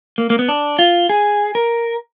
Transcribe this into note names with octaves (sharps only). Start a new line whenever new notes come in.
A#3
A#3
B3
D4
F4
G#4
A#4